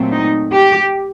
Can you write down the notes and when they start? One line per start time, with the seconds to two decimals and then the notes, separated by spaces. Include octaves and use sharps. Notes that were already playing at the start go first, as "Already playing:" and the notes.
Already playing: A#2 F#3 A3 C4
0.11 D#4
0.52 G4